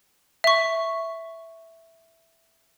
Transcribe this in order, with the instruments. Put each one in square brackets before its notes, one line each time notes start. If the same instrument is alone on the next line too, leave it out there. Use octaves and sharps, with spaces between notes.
[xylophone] E5 C#6